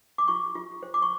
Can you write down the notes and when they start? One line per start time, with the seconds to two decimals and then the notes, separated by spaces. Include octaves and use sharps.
0.18 D6
0.28 F4 C#6
0.55 F4
0.83 C5
0.94 D6
1.02 C#6